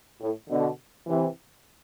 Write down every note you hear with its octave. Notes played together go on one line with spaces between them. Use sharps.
A2
B2 D3
C3 E3